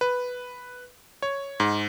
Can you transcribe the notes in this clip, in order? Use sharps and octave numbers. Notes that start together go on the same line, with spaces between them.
B4
C#5
G#2